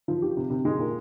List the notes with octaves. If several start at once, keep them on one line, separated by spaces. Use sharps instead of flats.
F3
G4
C3
C3
G#3
A#2